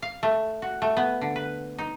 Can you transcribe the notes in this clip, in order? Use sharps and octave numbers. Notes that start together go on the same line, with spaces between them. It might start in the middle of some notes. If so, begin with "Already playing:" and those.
F5
A3
F#4
A3
B3
D3
B4
D#4